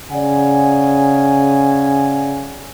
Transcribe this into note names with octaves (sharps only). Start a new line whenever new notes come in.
C#3 D5 F#5 G#5